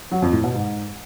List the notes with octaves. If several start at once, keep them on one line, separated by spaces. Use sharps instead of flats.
F#3
F2
A2
B2
G#2